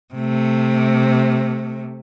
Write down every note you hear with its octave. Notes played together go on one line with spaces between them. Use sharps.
C3 A3